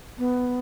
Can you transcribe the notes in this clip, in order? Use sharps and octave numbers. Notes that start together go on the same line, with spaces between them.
B3